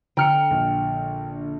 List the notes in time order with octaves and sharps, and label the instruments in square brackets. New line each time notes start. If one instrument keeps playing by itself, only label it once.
[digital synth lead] D3 [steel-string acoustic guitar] G5 [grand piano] A#5 F6 C#7
[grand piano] A#1